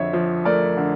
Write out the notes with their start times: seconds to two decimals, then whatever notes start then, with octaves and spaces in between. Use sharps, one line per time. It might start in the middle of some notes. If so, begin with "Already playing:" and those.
Already playing: F2 D3 C#5 E5
0.13 F3
0.45 A3 A#4 D5
0.77 D3